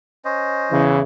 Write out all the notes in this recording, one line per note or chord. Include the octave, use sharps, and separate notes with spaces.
C#4 C5 D#5
E2 C#3 E3